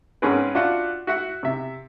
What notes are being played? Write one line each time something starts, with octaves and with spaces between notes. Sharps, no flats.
G#2 C4 C#4 G#4 A#4 B4
D4 F4 F#4 E5 F#5
F#4 E5 F#5
C3 E5